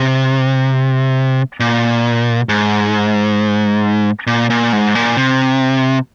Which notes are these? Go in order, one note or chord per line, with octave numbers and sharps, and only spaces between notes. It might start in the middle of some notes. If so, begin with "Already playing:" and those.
Already playing: C3
A#2
G#2
A#2
A#2
G#2
A#2
C3